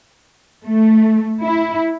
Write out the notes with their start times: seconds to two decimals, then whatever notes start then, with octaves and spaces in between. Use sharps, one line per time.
0.65 A3
1.42 E4